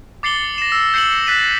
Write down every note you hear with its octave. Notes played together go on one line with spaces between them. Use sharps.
D6 A6 C7 C#7 F#7 G7
A#6 E7
E6
G6 C7 C#7 E7 F#7
F#6 A6 B6 D#7 E7